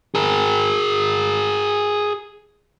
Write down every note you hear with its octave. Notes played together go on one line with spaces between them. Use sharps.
G#4 A#4